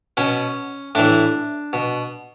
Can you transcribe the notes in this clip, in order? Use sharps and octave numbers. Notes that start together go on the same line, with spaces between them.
B2 C#4
A2 E3 D4
B2